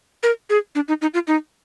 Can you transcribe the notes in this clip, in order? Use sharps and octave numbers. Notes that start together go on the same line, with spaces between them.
A#4
G#4
D4
D#4
D#4
F4
D#4